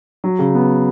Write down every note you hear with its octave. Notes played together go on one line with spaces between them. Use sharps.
F#3
C#3
B3